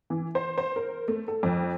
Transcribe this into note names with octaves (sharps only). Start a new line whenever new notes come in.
E3
C5
C5
A#4
A3
A4
F2